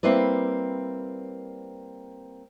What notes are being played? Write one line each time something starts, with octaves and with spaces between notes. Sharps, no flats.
G3 A#3 C4 E4 B4 D5